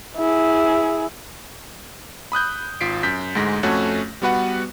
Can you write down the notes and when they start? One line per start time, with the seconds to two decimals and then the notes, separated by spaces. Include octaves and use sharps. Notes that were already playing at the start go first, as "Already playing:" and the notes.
0.17 E4 G#4
2.32 B5 D#6 F#6 G6
2.81 G#1 F4 B6 C7 D7
3.03 F#2 G6 B6
3.35 D2 G#2 G#3 A#6
3.63 F2 A3 C#4 F#4 C#5 F#6
4.22 G3 B3 F#4 B4 F#5